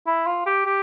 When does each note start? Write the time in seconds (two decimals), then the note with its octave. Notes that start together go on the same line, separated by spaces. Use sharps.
0.07 E4
0.26 F4
0.46 G4
0.65 G4